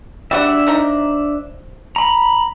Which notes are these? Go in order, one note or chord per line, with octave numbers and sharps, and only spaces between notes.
G3 D4 F#4 E5 F#5
F3 D#4 A#5
A#5 B5